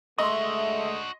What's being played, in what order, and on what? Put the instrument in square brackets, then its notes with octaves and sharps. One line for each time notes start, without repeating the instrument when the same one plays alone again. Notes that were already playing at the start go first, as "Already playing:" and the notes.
[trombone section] G#3 A3 [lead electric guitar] D4 F#4 [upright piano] D#5 C6 [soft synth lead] E5